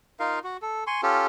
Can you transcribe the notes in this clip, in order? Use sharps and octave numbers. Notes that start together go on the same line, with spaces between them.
D#4 F4 A#4 F5
F#4
A4
G#5 C6 C#6
C#4 F4 G4 A4